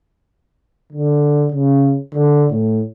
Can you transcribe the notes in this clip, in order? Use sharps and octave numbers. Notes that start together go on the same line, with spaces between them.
D3
C#3
D3
A2